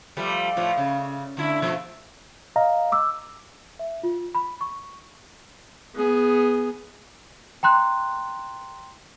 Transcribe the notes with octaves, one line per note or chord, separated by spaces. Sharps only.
F3 G3 A3
A2 F3 A3
C#3
D3 A3 E4
B2 F3 A3
D#5 F5 A#5
D6 E6
E5
F4
B5
C#6
B3 G#4
G5 A#5 C6 F#6